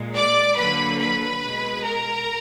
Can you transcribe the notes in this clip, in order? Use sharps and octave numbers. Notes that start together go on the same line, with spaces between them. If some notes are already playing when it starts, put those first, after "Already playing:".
Already playing: A#2 G#3
D5 D6
D3 F#3 A#3 B4 B5
B4 B5
B2 G#3
A#4 A#5